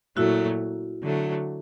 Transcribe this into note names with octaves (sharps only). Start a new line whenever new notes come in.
A#2 F#3 A3 E4 F#4
D3 F#3 A3